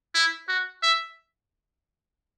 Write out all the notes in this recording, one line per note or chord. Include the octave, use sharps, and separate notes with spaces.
E4
F#4
E5